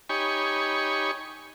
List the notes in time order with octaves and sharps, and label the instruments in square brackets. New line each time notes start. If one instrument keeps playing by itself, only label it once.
[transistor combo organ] D#4 G4 C#5 G#5 B5 C#6